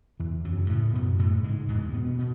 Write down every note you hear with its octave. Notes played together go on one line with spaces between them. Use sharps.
E2 E3
F#2 F#3
C#3
A2 A3
F#2 B2 B3
A2 A3
C#3
G#2 G#3
E2 G#2 G#3
B2 B3
B2
B2 B3